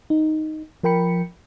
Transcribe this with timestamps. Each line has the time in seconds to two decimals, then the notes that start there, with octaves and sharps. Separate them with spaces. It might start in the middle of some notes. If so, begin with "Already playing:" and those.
0.10 D#4
0.83 F3 A#4 G5 B5 C#7